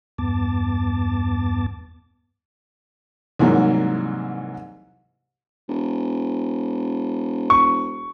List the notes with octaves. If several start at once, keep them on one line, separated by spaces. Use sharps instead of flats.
E2 G2 B3 A5 D6 A6
C2 G#2 E3 F#3 A#3
E1
C#6